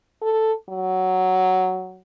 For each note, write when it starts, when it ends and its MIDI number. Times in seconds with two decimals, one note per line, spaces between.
0.22 0.53 69
0.69 2.02 54